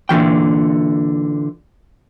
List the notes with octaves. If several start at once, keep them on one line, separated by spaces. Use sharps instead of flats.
A#2 D3 E3 G5